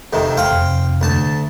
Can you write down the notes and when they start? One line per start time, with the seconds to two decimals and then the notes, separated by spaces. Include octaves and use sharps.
0.13 F2 C3 D#3
0.37 C5 F5 G5
0.51 F2 C3
1.01 D2 A5